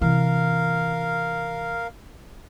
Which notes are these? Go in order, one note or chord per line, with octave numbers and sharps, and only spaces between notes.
C3 E3 A#4 F5